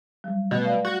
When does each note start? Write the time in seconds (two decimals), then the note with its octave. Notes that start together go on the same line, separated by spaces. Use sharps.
0.24 F#3 G3
0.51 B2 A3
0.65 D5 F5
0.85 F#4